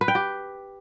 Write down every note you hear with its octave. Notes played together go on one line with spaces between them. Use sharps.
B4
G5
G4